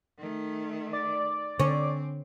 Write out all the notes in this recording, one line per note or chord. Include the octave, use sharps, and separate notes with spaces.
D#3 A3
D5
D3 C4 C#4